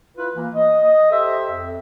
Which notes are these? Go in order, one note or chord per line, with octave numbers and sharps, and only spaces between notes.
E4 F4 B4
E3 A#3
D#5
G4 A4 C5 E5
F2